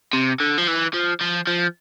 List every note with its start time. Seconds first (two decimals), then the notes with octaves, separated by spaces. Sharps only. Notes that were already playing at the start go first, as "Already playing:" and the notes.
0.13 C3
0.40 D3
0.58 F3
0.67 E3
0.94 F3
1.21 F3
1.47 F3